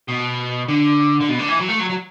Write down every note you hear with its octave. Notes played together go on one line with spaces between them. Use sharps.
B2
D3
D3
B2
D3
E3
F#3
A3
F#3
F#3